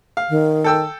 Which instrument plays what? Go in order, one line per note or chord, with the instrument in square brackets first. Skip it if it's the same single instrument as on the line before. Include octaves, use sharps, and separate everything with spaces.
[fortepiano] F5
[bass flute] D#3
[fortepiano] A4 G5 E6